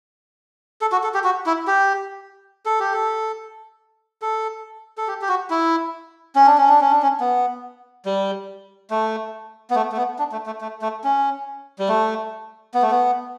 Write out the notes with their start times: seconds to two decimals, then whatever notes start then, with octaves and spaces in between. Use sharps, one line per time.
0.81 A4
0.92 F#4
1.04 A4
1.14 G4
1.24 F#4
1.46 E4
1.67 G4
2.66 A4
2.80 G4
2.93 A4
4.22 A4
4.98 A4
5.08 G4
5.21 G4
5.29 F#4
5.50 E4
6.36 C#4
6.46 D4
6.58 C#4
6.69 D4
6.81 C#4
6.91 D4
7.03 C#4
7.20 B3
8.06 G3
8.91 A3
9.71 B3
9.76 A3
9.92 A3
9.97 B3
10.19 D4
10.32 A3
10.46 A3
10.61 A3
10.82 A3
11.04 C#4
11.79 G3
11.89 A3
12.74 B3
12.82 A3
12.91 B3